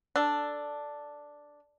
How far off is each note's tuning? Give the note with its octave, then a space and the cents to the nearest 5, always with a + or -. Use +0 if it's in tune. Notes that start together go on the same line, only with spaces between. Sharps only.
D4 +0 A4 +0